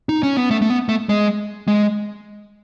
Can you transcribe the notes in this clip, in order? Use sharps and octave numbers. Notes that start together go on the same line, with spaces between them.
D#4
C#4
B3
A3
A3
B3
A3
G#3
G#3